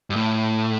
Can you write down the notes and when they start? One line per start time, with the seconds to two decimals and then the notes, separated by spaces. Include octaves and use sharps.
0.10 G2
0.16 A2